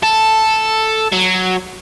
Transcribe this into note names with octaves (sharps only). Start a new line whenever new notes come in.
A4
F#3